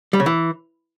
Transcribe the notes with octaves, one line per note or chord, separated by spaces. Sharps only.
G3
C#3
E3